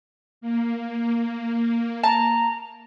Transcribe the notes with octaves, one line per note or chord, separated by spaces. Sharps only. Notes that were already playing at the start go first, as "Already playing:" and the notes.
A#3
A5 A#5